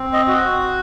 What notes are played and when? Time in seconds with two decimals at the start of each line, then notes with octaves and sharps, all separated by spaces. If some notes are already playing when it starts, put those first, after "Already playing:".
Already playing: C4
0.13 D#5
0.28 F#4